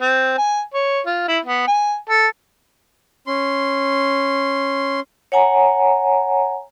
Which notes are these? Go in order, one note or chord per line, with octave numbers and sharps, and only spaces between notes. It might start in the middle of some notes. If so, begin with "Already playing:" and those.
C4
G#5
C#5
F4
E4
B3
G#5
A4
C#4 C6
C#5 F#5 G#5 A#5